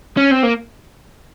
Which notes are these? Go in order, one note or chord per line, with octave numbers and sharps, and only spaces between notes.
C#4
C4
A#3